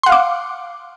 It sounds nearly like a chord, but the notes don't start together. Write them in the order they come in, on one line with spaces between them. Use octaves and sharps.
C6 F#5 F5 D6